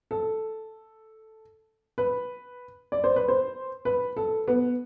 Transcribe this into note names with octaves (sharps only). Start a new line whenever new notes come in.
A4
B4
D5
C5
B4
C5
B4
A4
B3